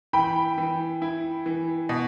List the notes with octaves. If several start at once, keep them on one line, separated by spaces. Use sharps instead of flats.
E3 G5 B5
E3
E4
E3
B2